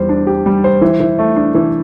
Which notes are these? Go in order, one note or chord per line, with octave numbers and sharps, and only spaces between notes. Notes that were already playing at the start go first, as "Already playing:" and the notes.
Already playing: E2 G3 C5
D4
G4
G3
C5
E3
E3
A3
D4
E3